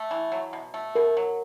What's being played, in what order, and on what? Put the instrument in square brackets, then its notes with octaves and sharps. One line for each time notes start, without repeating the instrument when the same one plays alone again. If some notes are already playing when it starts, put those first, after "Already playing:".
Already playing: [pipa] A3
E3
F#3
B2
A3
[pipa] B2 [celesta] A#4
[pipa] F#3